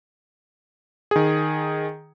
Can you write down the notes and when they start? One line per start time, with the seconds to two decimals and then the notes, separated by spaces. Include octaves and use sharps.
1.11 D#3 G#4